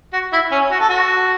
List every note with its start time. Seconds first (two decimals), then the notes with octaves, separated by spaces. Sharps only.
0.13 F#4
0.32 E4
0.51 C#4
0.71 F#4
0.80 A4
0.89 F#4